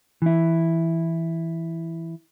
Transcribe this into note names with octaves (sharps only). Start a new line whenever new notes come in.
E3 E4